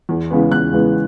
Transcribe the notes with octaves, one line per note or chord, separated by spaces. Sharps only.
E2
C#3 E3 G#3 B3
E2 F#6
C#3 E3 G#3 B3